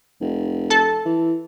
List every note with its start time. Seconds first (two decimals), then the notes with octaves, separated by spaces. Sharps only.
0.20 F1
0.70 A4 A5
1.05 E3